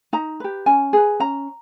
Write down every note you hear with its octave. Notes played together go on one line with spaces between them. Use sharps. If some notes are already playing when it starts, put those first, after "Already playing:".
D#4 A#5
G4 B4
C#4 G#5
G#4 B4
C#4 A#5